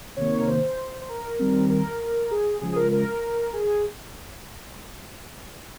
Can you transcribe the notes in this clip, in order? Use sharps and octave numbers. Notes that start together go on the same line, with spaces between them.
C3 D#3 A#3 C#5
A#4
C5
C5
A#4
D#3 G3 C4
A#4
G#4
C#3 F3 G#3 G#4
G#4
A#4
A#4
G#4